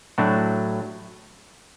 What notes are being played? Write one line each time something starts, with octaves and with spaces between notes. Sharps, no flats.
A2 F#3 A3 D4 F#4